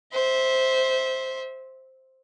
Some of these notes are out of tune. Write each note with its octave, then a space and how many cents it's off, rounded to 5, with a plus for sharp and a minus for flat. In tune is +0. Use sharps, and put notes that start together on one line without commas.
C5 +0 E5 -20